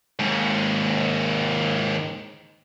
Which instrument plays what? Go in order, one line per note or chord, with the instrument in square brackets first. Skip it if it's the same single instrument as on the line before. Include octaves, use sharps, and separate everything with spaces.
[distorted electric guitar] D#2 G#2